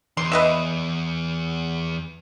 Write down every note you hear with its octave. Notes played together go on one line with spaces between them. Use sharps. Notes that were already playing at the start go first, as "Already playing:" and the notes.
E2 C6
B4 D#5 E5